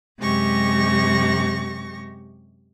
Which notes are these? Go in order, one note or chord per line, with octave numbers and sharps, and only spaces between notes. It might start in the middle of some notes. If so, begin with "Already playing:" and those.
F#2 C3 G#3 G4 C#6 A#6